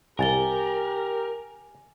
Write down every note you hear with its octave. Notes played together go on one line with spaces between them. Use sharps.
C2 G4 A#4 G#5 A6 G7